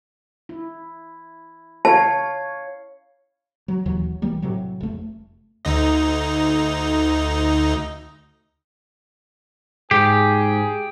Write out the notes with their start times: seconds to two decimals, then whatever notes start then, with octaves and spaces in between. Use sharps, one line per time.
0.49 E4
1.85 C#5 F5 A5
3.68 F#3
3.85 E1 D#2 E3 F#3
4.22 B1 E3 G3 A#3
4.42 A2 C3 F#3
4.81 F1 A3
5.65 D2 D#4 D#5
9.91 G#2 G4 G#4